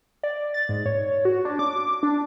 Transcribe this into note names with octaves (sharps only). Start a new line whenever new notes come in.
D5
A6
G#2
C#5
F#4
D4
D6
D4